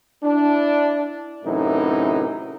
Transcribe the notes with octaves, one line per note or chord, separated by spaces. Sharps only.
D4 E4
F#2 A2 C3 E3 D#4 E4